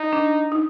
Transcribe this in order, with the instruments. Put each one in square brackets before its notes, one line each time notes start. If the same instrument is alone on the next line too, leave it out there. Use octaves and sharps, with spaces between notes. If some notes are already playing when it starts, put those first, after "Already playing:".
Already playing: [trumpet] D#4
[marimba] D4
D#4